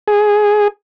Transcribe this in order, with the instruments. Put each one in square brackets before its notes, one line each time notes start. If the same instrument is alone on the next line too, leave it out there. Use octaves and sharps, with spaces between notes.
[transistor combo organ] G#4